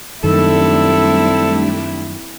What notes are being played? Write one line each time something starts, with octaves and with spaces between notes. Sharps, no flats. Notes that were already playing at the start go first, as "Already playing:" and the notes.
F#2 D#3 G3 A3 C4 D4 E4 A4